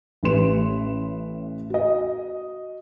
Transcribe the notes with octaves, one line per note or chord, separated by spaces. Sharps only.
A1 A2 G4 B4 C6 E7
F#4 D#5